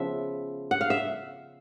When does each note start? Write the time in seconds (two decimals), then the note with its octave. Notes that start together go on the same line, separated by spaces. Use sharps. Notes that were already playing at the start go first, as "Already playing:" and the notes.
Already playing: C#3 F3 B3 E5
0.71 F#5
0.81 F5
0.90 E5